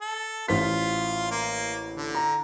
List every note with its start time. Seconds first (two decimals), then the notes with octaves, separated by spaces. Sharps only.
0.02 A4
0.49 A1 F4 C5 B6
1.31 A#3
1.95 D3
2.15 A#5